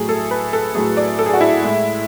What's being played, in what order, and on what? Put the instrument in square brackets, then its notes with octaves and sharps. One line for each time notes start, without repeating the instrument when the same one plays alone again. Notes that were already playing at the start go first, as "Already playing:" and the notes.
Already playing: [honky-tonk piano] A2 F#3 A3 G#4
A4
B4
A4
A2 F#3 A3 G#4
D5
A4
G#4
F#4
E4
A2 G#3